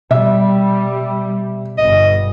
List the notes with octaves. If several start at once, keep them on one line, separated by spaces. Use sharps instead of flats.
B2 G3 E5
G1 D#5